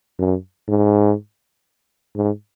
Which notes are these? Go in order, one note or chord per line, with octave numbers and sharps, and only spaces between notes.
F#2
G#2
G#2